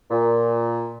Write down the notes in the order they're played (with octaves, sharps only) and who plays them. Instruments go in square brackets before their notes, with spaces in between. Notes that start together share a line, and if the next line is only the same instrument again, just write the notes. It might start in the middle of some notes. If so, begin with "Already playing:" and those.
[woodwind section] A#2